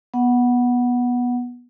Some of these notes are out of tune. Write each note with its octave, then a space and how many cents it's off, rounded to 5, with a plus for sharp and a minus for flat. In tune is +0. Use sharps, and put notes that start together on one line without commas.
B3 -15 F#5 +0